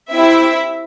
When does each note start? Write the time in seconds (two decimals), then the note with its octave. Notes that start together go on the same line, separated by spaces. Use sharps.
0.12 C4 E4 G4 E5